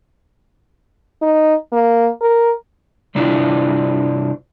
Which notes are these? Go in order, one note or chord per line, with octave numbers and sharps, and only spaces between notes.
D#4
A#3
A#4
G2 C3 D4 E4 F4